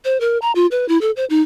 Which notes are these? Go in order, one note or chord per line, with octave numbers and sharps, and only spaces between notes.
C5
A#4
A#5
F4
B4
E4
A4
C5
D#4